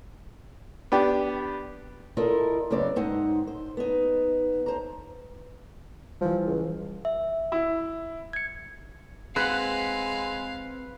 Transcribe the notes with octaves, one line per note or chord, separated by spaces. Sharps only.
B3 D4 G4
E4 F4 A4 A#4 D5 D#5
F#2 C#3 B3 C4 D5
G#2 C4 D#4 F#5
C5
B3 D#4
C5 A#5
E3 F3 G3
C#2
E5
E4
G#6 C#7
G#3 C4 B4 F5 F#5